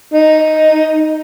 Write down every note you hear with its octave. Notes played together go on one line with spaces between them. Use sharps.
D#4